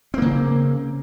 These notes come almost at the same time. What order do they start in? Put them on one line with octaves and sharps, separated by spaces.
C4 A#3 C#3